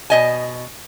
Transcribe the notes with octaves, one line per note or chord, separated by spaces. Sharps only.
B2 D#5 G#5